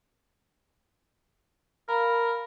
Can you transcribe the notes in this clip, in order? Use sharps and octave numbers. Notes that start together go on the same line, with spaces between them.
A#4 F5 A#5 B5